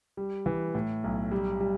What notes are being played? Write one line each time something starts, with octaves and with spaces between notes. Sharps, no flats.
G3
E3
A2
B1
G3
G3